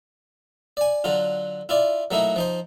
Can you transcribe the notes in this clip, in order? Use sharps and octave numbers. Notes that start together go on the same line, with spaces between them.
D5 G#5
D3 F#3 F4
E4 F4 D5
F#3 A3 A#3 D#4 E4
F3 D#4 C5